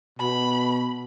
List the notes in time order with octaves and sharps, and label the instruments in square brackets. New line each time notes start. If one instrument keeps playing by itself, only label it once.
[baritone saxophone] B2 [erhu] B5